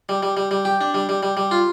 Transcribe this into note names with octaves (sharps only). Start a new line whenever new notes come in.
G3
G3
G3
G3
G4
D4
G3
G3
G3
G3
F4